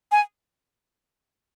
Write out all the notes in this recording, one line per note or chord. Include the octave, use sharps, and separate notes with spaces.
G#5